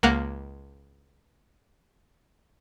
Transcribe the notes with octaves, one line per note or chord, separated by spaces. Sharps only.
C#2 A#3 A#4 F#5